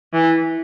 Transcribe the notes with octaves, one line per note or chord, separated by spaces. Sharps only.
E3